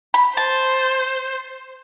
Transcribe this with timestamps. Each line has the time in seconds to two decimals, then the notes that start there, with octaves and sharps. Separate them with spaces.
0.14 B5
0.37 C5 A5